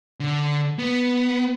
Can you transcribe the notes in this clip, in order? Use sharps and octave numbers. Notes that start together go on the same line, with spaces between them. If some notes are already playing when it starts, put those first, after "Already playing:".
D3
B3